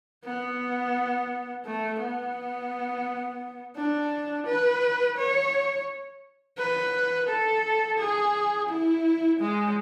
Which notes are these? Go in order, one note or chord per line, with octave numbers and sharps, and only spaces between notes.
B3
A3
B3
D4
B4
C#5
B4
A4
G#4
E4
G#3